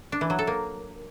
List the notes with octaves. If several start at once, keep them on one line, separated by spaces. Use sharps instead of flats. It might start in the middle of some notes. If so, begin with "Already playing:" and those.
D4
E3
F#3
A4
A#3